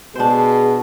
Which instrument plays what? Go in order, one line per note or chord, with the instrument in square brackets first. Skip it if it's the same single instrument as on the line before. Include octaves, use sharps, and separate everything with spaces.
[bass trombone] B2 [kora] D4 C5 [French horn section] G#4